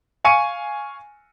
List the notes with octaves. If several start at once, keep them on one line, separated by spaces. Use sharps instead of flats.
F5 G#5 C#6 C#7 D#7